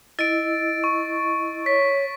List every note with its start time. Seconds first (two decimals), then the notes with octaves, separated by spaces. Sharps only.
0.19 E4 D#5 E6 A6 D7
0.84 C#6
1.66 C#5 B6